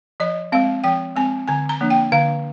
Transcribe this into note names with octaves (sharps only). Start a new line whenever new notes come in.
F3 D#5
G#3 C4 F5
F3 G5
G#3 C4 G#5
D3 G#5
A#5
F3 A#3 D4
G5
D3 F5